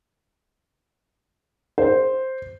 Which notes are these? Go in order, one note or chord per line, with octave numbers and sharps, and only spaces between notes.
C5